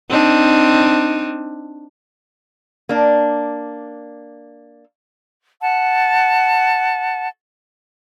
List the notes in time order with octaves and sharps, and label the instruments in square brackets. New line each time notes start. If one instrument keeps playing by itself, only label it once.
[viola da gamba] C4 D4 D#4
[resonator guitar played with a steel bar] A#3 D4
[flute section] F#5 A5